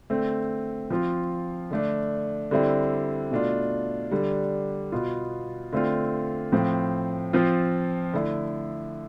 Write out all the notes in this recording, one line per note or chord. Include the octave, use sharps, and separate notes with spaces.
D3 A3 C4
F3 C4 F4
D3 A3 D4
D3 G3 C4 E4
B2 A3 D4 F4
D3 G3 D4
B2 B3 F4
D3 A3 C4 F4
A2 F3 C4
F3 C4 F4
D3 A3 E4